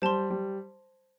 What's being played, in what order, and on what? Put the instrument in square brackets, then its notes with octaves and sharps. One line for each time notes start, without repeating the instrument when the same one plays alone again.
[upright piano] G3 [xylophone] C5 A5 C6
[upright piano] G3